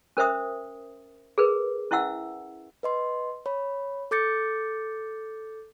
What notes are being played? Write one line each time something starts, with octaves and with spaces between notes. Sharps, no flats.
C#4 A#4 C5 E5 D#6
G#4 A#4 B4
C#4 E4 E5 F#5 E6
B4 D#5 C6
C#5 B5
A4 D6 G6 A6 C#7